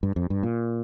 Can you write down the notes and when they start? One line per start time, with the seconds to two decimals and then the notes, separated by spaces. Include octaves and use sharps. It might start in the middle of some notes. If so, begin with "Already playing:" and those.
0.03 G2
0.16 F2
0.30 G2
0.43 A#2